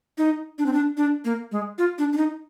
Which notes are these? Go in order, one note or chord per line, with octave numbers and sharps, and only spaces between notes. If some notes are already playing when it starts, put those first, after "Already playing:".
D#4
D4
C4
D4
D4
A#3
G#3
F4
D4
D4
D#4